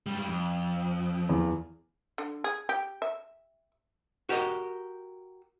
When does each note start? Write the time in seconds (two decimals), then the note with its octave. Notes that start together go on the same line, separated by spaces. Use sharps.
0.06 G#2 G3
0.28 F2
1.29 E2
2.18 D3
2.44 G#4
2.69 G4
3.02 E5
4.29 F#4 G4 A#4 D#5